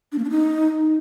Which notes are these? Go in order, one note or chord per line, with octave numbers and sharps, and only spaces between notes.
D4
A#3
D4
D#4